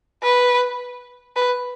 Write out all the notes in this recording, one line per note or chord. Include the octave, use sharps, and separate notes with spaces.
B4
B4